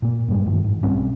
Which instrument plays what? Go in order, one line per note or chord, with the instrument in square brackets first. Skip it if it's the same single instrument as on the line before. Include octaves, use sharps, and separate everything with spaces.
[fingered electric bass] A#2 A#3
G2 G3 G#3
G2 D#3 E3
G#2
B1 G3 C4 C#4